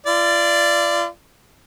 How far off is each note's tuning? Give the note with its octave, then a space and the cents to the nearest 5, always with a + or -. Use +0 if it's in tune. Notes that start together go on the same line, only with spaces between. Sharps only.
F4 -40 D5 +0